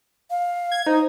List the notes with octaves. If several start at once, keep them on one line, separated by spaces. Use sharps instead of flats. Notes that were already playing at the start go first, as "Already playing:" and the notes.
F5
G#6
D#4 C5